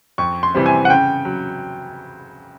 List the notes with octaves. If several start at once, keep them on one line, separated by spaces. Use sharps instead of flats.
F2 C#6
C6
C3 E3 G3 C4
G#5
F#5
C#3 G5
F#3